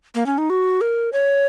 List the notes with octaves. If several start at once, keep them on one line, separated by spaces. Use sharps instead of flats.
A#3
C#4
D#4
F#4
A#4
C#5